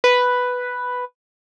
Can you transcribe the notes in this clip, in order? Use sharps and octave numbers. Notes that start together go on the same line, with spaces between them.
B4